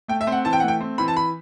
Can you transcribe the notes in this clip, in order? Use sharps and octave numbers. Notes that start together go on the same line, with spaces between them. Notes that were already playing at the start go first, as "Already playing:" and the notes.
A3 G5
E5
C4
F#5
E3 A5
G5
F#5
A3
G5
C4
E3 B5
A5
B5